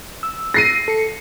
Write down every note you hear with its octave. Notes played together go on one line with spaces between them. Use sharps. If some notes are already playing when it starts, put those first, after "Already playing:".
E6
A#6 C7 D#7
A4 C#7